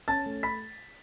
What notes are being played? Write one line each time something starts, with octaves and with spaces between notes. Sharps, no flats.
C#4 A5 A6
A3
B5 B6